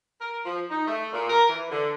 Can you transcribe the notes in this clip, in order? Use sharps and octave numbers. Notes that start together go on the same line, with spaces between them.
A#4
F3
D#4
A3
A#2
A#4
E3
D3